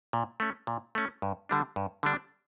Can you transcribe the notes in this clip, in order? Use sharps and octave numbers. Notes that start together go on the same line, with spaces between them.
A#2
A3 C#4
A#2
A3 C#4
G2
D3 G3 D4
G2
D3 G3 D4